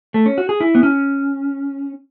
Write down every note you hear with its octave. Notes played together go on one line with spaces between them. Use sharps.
A3
C#4
F#4
G#4
E4
B3
C#4